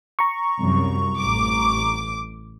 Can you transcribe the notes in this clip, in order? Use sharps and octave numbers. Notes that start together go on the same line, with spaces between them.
A#5 C#6
C2 F#2
A1 D6